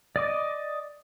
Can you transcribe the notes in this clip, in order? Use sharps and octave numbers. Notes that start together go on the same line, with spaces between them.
D5 D#5 D6